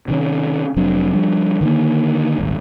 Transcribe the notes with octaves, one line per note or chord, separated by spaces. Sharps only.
C3 D#3 C#4
F1 F#3 C4 D4
F3 G3 D4
D3 D#3 A#3
D#1 G#1